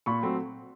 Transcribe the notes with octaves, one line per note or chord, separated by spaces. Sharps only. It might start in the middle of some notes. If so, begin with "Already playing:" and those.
A#2 B5 C#6
F#3 A3 C4